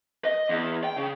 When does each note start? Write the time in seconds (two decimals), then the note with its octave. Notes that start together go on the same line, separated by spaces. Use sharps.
0.25 D#5
0.49 E2
0.84 G5
0.97 C#3